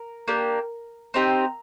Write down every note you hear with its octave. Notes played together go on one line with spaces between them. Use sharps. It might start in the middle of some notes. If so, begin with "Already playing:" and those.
Already playing: A#4
A#3 D4 G4
C4 D#4 G4